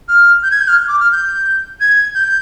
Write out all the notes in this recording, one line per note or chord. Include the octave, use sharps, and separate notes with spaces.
F6
G6
G#6
G6
F6
D6
F6
G6
G#6
G6